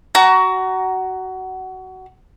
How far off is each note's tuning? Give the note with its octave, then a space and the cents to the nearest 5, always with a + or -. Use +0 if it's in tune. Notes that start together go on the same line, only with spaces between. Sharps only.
F#4 +20 A#5 +0